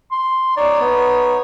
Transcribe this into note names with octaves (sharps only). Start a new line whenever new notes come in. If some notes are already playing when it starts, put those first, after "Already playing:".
C6
D#4 C#5 D5
B3